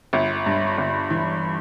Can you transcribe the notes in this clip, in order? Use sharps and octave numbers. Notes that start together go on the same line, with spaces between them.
G1
G2
G1
E3